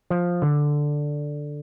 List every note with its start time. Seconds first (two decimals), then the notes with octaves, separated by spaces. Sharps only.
0.10 F3
0.42 D3